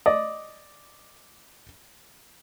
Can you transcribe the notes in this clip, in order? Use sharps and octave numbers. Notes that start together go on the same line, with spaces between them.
D5 D#5